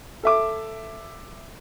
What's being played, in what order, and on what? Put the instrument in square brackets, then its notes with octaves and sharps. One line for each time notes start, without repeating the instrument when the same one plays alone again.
[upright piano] A4 E5 D6